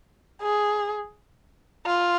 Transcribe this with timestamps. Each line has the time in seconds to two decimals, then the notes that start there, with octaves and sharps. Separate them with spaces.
0.42 G#4
1.86 F4